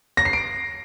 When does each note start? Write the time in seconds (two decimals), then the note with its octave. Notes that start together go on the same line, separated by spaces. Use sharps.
0.17 A#6
0.25 C7
0.33 D7